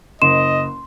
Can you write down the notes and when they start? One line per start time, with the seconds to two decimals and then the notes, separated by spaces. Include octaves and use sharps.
0.22 F#1 D#5 C6 E7